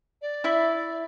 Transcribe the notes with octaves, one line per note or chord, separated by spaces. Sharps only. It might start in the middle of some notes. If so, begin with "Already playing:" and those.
D5
E4 E5